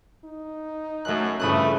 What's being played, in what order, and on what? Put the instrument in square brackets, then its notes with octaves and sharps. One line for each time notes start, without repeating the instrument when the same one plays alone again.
[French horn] D#4
[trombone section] F#2 [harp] A3 F#6
[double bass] G2 C#3 [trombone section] E3 F3 A3 [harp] B5 D#6 F#6